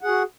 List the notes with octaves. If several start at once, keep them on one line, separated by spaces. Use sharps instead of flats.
F#4 G#4 F#5